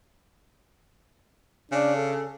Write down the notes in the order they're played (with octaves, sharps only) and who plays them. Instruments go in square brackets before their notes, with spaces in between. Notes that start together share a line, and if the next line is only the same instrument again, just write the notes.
[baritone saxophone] C#3 [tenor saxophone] D4
[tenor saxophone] A4